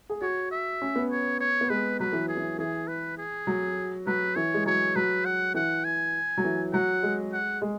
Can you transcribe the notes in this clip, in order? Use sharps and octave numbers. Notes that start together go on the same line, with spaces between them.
G#4
F#4 C#5
E5
C#4
B3
C#5
C#5
B3
G#3 B4
F#3 B4
E3
G#4
E3
E3 G#4
B4
G#4
F#3
F#3 B4
E3 C#5
G#3
F#3 C#5
F#3 B4
F#5
E3 F#5
G#5
F#3
E3
F#3 F#5
G#3
F#5
G#3